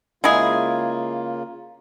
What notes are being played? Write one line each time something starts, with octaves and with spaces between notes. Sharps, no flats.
C#3 G#3 A#3 E4 F4 G#4